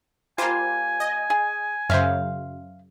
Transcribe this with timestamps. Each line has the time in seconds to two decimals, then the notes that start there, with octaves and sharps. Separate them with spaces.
0.38 G3 A#3 F4 C5 G#5
1.00 D#5
1.30 G#4
1.90 F#2 C#3 C5 E5 F5